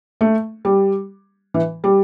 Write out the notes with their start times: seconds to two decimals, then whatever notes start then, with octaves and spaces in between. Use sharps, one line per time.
0.21 A3
0.65 G3
1.54 E3
1.84 G3